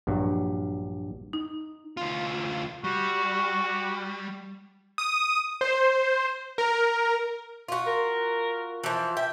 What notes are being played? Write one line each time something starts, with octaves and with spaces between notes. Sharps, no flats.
A#1 G2 F#3
D#4
D2 F4
G3 F#4
D#6
C5
A#4
F4 F#4
A#4
E3 F3
E5 G5